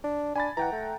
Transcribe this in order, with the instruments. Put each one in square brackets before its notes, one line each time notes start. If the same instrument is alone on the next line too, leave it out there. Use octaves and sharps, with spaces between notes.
[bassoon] D4
[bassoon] D4 [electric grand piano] G#5 B5 A6
[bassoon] E3 [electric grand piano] F#5 G5 A#5
[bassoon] A3